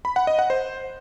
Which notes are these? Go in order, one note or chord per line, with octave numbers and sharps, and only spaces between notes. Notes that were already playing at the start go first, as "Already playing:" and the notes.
B5
F#5
D#5
F#5
C5